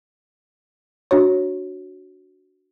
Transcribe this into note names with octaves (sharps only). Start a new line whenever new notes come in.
D4 F#4 C#5